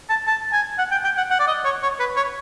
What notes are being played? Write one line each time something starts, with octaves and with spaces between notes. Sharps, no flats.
A5
A5
G#5
F#5
G5
G5
F#5
F#5
D5
D#5
C#5
C#5
B4
C#5